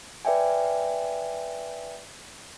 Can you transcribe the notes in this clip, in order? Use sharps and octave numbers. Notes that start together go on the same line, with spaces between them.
B4 D5 E5 G5 G#5